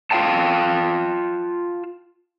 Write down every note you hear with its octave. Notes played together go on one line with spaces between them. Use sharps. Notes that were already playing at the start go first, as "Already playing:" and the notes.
F4 F5 G5 A5